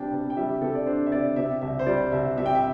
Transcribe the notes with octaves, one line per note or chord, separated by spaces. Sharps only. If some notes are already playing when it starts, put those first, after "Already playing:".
Already playing: C3 G3 D4 G5 A5
C3
G5
G3 E5
G4
C3 A4
D5
D4 C5
E5
C3 D5
C3 E5
C2 E5
C5
G3 D5
C2 E5
C3 E5
G5
E5